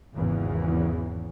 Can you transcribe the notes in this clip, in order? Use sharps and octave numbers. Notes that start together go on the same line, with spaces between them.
G#1 E2 C#3 E3